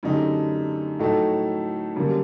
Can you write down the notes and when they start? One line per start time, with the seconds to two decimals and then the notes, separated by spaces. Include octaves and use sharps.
0.03 F#2 D3 A3 D#4 G4
0.99 A2 F#3 A3 D#4 A4
1.96 F#2 D3 G3 A#3